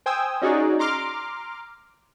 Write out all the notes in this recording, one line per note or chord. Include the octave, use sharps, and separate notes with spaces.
C5 G5 G#5 D#6 E6
C#4 D#4 F#4 G#4 C#5 D5
A#5 C6 D6 F6